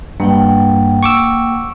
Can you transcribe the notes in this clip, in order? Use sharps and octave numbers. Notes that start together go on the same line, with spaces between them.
G2 A#3 F#5 G5
C#6 D6 E6